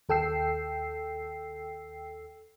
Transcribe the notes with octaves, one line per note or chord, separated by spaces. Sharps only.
D#2 A4 G5 E6 C7